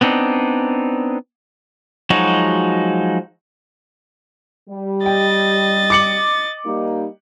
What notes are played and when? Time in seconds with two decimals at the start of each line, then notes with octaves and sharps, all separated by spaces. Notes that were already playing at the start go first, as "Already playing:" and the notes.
0.01 B3 C4 D4 D#4
2.10 F3 F#3 G#3 D#4 F#4
4.70 G3
5.06 D#5 G5 A6
5.90 D6 C#7 F#7
6.66 G3 A#3 D#4